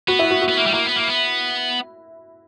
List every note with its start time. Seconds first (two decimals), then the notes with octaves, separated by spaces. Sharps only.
0.08 B3 F#4
0.19 E4
0.30 F#4
0.42 F#4
0.49 B3
0.57 A#3
0.66 G3
0.74 A#3 E4
0.86 B3
0.96 A#3
1.08 B3